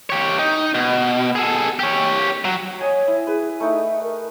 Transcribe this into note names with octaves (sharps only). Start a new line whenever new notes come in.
G4 C#5
D#4
B2
G#4 A4
G4 C#5
F#3
C#5 D#5 G#5
E4
G#4 B4
A3 D#4 E5
A#4